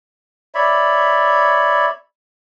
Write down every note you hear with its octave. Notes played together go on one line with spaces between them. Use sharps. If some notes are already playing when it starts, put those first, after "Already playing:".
C#5 D5 E5 B5